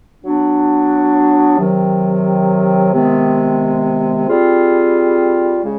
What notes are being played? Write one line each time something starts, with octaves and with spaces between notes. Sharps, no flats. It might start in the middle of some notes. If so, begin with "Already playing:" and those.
F#3 B3 D4
C3 D#3 F#3
C3 D#3 G#3 B3
G3 C4 F4 G#4
C#3 G#3